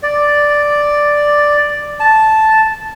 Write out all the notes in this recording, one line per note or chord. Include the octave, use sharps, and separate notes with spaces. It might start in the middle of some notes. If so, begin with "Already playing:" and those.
D5
A5